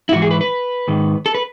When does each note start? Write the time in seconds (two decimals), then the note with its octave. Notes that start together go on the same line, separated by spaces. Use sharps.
0.09 E4
0.12 G#2 E3 F#4
0.22 G#4
0.31 B4
0.41 B4
0.88 G#2 D#3
1.26 A4
1.35 B4